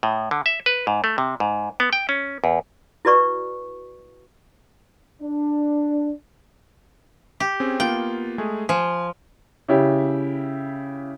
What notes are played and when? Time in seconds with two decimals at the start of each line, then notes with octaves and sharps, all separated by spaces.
0.03 A2
0.31 D3
0.46 E5
0.66 B4
0.87 G#2
1.04 A3
1.18 C3
1.40 G#2
1.80 B3
1.93 G5
2.09 C#4
2.44 E2
3.05 E4 F#4 B4 D5 C#6
5.23 D4
7.40 G4
7.60 C4 C#4 G#4
7.80 A#3 B3 F4 G5
8.38 G#3 A3 G#4
8.69 F3 G#5
9.69 C#3 E4 G4